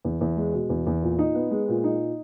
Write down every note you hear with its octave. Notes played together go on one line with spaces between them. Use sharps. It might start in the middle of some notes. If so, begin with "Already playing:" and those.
E2
E2
G#3
B2
E2
E2
A#2
D#4
B3
G#3
A#2
D#4